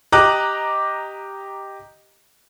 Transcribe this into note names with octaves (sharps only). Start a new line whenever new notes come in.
G4 D#5 A#5 D6 F#6